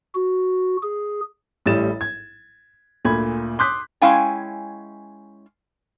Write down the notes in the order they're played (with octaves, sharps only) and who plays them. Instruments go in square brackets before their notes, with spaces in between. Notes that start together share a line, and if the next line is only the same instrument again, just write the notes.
[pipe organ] F#4
G#4
[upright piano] A1 A2 G3 A6 E7
G#6
D2 A#2 B5 G#6
C6 D6 D#6 F#6 G6 B6
[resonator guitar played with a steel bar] G#3 C#4 E4 F5 G5 G#5